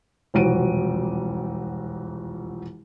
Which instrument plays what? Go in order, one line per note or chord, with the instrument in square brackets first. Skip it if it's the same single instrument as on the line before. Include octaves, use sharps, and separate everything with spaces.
[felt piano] E1 C2 F2 F#4 D7 D#7